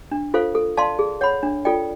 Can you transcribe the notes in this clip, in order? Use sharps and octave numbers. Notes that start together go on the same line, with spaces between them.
D4
F4 A4 C5 F5
A4
D5 F5 A5 C6
G#4
C#5 F#5 B5
D4
F4 A4 D5 G5